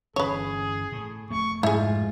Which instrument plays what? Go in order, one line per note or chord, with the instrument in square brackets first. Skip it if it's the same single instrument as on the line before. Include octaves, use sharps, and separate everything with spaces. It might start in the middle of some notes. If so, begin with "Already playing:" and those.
[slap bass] G1 E3 C#4 [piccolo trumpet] G#4 [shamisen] B4 C#5
[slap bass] A2
[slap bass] F1 A3 A#3 [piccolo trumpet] C#6
[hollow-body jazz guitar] G#2 [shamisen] E4 G#4 [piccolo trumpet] F4